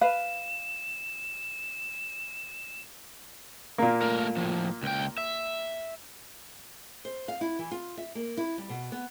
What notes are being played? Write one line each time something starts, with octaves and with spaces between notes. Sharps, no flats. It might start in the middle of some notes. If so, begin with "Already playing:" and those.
B4 F5 E7
A#2 A#3
A3 A#4
A2 F3
C#2 G5
E5
C5
F5
E4
E3
F4
E5
A#3
E4
G3
B2
B3